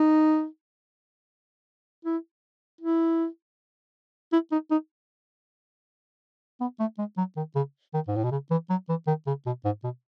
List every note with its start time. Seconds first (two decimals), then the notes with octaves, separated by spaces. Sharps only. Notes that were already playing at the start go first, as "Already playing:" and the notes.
Already playing: D#4
2.05 E4
2.81 E4
4.32 E4
4.52 D#4
4.71 D#4
6.61 B3
6.80 A3
6.98 G#3
7.17 F#3
7.37 D#3
7.55 C#3
7.94 D#3
8.08 G#2
8.16 A2
8.24 B2
8.31 C#3
8.50 E3
8.70 F#3
8.89 E3
9.07 D#3
9.27 C#3
9.46 B2
9.65 G#2
9.83 B2